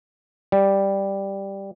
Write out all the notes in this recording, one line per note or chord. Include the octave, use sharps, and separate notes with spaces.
G3